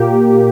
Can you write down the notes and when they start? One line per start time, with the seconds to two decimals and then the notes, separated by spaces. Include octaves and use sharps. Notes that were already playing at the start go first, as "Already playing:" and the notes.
Already playing: A#2 A#3 G4